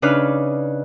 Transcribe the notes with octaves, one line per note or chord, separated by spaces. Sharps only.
C#3 D4 D#4 B4 F6 F#6